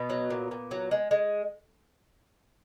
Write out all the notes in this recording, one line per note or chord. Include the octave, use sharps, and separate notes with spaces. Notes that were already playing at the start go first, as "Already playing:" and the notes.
Already playing: B2 B3
F#3
A#2
A#2
F#3
G#3
G#3